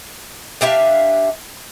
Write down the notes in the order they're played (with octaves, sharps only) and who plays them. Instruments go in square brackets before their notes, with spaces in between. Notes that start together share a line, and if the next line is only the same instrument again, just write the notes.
[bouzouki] D4 G4 E5 F5